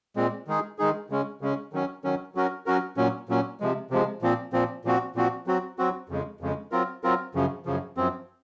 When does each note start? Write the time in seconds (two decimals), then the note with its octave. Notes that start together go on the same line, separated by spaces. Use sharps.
0.16 A#2 G#3 C4
0.48 D#3 G#3 D#4 G#4
0.79 D#3 G#3 D#4 G#4
1.10 C#3 G#3 C#4
1.41 C#3 G#3 C#4
1.73 D#3 F#3 C#4
2.04 D#3 F#3 C#4
2.35 F#3 C#4 F#4 A#4
2.66 F#3 C#4 F#4 A#4
2.97 A#2 F#3 C#4
3.29 A#2 F#3 C#4
3.60 C3 F3 G#3
3.91 C3 F3 G#3
4.22 A#2 F3 C4
4.53 A#2 F3 C4
4.85 A#2 F3 C4 F#4
5.16 A#2 F3 C4 F#4
5.47 F#3 C4 F#4
5.78 F#3 C4 F#4
6.09 F2 C#3 G#3
6.41 F2 C#3 G#3
6.72 F#3 C4 F4 A#4
7.04 F#3 C4 F4 A#4
7.35 F#2 C#3 F3
7.65 F#2 C#3 F3
7.97 F#2 F3 C4